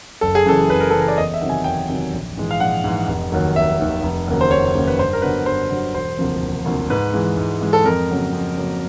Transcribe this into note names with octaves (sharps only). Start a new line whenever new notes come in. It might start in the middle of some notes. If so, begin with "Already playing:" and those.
F#1 A4
G#4
F#2 C#3 E3 A4
F#1 B4
A#4
F#2 C#3 E3 A4
A#4
D5
E2 D#5
E5
C3 D#3 F#3
G#5
E2 G5
C3 D#3 F#3
A#1
G#2 E3 G#3
F5
A#1 F#5
G#2 E3 G#3
F1
D#2 D#3 F#3
F1 E5
D#2 D#3 F#3
F1
D#2 C#3 F#3 A#3
C5
F1 C#5
D#2 C#3 F#3 A#3
B4
G2 C5
A#4
D3 F#3 B3 D4 B4
G2 C5
D3 F#3 B3 D4
E1 C5
D2 C3 F3 A#3
E1
D2 C3 F3 A#3
G#2 B4
E3 G#3
G#2
E3 G#3
A4
F2 A#4
C#3 F#3 A#3
F2
C#3 F#3 A#3